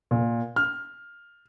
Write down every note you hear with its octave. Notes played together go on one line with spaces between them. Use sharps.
A#2
F6